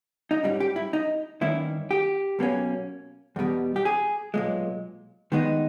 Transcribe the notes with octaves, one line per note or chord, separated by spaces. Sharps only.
D#4
G#2 G3 C#4 E4
G4
E4
D#4
G2 D#3 A#3 C#4 E4
G4
B1 B2 A#3 C#4
E2 B2 G3
G4
G#4
B1 A#2 G#3
G2 D#3 G#3 B3 D#4